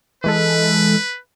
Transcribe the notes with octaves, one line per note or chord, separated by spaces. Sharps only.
E3 G#3 A4 B4